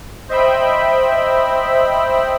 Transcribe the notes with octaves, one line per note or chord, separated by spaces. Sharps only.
C5 D#5 E5 G5 B5